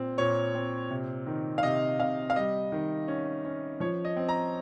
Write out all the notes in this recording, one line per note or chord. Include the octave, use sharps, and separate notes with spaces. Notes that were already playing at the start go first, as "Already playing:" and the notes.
Already playing: A#2 C4
A#2 C#5
C4
C3
D#3
F5
C3 D#5
C3 F5
F5
G3 D#5
D#3
C#4
C#4
F3 C#5
D#5
C4
A#5